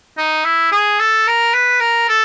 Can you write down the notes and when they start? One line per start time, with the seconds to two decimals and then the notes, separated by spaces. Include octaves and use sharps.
0.18 D#4
0.45 E4
0.72 G#4
1.00 A4
1.27 A#4
1.54 B4
1.81 A#4
2.09 A4